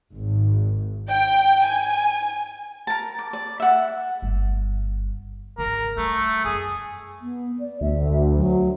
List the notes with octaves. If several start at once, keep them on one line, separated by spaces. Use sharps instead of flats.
G#1
G5
G#5
A#4 A5
D6
D5
E5 F#5
G1
G#1 D3 A#4
G3 A3
F#2 G#4
B3
D5
D2 E5
F#3